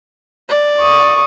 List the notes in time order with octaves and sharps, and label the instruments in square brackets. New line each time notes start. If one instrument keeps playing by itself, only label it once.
[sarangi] D5
[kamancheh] C#6 D#6